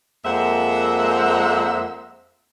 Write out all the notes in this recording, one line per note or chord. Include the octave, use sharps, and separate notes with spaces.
F2 G#3 A#3 C5 E5 F#5